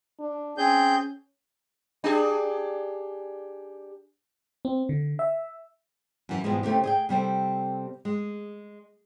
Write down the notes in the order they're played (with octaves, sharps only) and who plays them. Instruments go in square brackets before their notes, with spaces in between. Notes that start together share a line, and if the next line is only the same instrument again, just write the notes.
[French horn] D4
[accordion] C4 G#4 G6 [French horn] C#4
[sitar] D4 G4 G#4
[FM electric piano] C4
D3
E5
[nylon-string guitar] F#2 E3
G#2 B2 E3 F3 G3 G#3
C#3 A3 C4 G4
G#4 D#5 G5
C3 G3 C4 A4
G#3